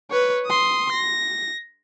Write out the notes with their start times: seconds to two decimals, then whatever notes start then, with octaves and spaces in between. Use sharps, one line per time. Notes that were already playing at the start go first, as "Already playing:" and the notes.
0.10 B4 C#5
0.46 C6 D#6
0.92 A#6